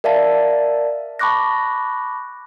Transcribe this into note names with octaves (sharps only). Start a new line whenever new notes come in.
A#4 D5 E5 F5 A5
A5 B5 C#6 D6 F#6 A#6